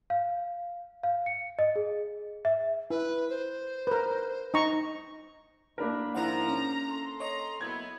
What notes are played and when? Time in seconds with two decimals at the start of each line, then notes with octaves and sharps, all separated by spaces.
0.10 F5
1.03 F5
1.26 C#7
1.59 D#5
1.76 G#4
2.45 E5
2.90 E4 B4
3.30 C5
3.87 A#4 B4
4.54 D#4 A#5 C#6
5.78 F#3 A3 A#3 D4 A#4 B5
6.15 G#2 D#3 F3 E4 C5 F#5 A#5
6.49 C#4
6.89 A4 C6
7.20 C#5 D#5 A#5
7.61 F#3 A#3 B3 E4 G#6